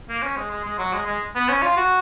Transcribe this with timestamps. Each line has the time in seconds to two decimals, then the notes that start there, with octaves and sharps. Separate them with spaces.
0.09 A#3
0.22 C#4
0.37 G#3
0.51 G#3
0.65 G#3
0.78 F#3
0.93 G#3
1.06 G#3
1.35 B3
1.49 C#4
1.62 F4
1.77 F#4